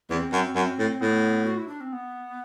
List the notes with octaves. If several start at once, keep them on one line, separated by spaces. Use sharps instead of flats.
E2 C4
F#2
F#2 C4
A2
A2 B3
F#4
E4
D4
C4
B3